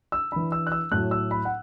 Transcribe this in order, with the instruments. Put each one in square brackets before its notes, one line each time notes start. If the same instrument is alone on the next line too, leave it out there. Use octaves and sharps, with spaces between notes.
[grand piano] E6
E3 D4 B5
E6
F#6
E6
A2 F#3 A3 F#6
E6
B5
F#5